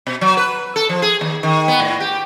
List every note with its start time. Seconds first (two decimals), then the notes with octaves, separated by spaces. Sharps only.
0.07 B2
0.21 F#3
0.37 B4
0.76 A4
0.89 F3
1.02 G#4
1.21 D#2
1.43 D#3
1.68 B3
1.80 A2
2.00 G4